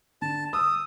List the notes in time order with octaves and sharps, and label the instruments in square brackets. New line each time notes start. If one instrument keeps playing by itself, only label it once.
[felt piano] D3 [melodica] A5
[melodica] D#6 [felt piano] E6